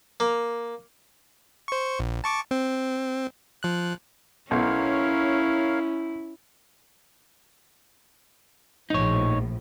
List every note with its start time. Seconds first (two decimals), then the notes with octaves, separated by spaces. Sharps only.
0.20 A#3
1.68 C5 C#6
1.99 A#1
2.24 A5 C#6 D6
2.51 C4
3.63 F3 F#6
4.51 B1 C#4 E4 A#4 C#5 F5
8.90 A#1 A2 F3 D#4 C#5